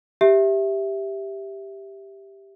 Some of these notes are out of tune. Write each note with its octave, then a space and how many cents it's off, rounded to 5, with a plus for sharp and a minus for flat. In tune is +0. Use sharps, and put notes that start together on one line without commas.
G4 +0 E5 +0